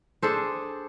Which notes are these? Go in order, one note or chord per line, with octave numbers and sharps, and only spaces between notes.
D4 G#4 A4 C5